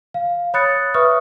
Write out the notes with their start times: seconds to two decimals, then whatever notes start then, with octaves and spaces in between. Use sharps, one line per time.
0.14 F5
0.54 C#5 B5 D#6 F#6 A6 C#7
0.94 B4 E5 C#6 D#6 F6